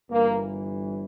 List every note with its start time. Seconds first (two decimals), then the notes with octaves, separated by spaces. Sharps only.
0.10 G1 G2 E3 A#3